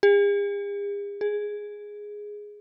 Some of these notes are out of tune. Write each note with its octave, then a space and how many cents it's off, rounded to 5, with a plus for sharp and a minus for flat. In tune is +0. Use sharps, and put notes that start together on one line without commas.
G#4 -45
G#4 +0